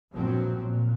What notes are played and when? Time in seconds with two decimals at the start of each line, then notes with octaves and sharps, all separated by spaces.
0.10 A#1 G2 B2 F3 F#3 C4
0.64 A#2